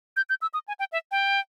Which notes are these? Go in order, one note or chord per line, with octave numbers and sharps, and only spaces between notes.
G6
G6
E6
D#6
G#5
G5
E5
G5